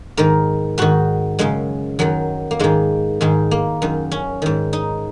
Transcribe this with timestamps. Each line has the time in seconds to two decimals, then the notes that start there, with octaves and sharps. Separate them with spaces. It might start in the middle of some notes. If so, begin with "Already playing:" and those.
0.17 G#2 D#3 A#4
0.78 G#2 D#3 F#4
1.39 F#2 C#3 G#3
1.99 F#2 D#3 F#3
2.51 A#3
2.59 G#2 D#3 G#3
3.21 G#2 D#3 G#3
3.51 A#3
3.82 F#2 D#3
4.11 C#4
4.42 G#2 D#3
4.73 D#4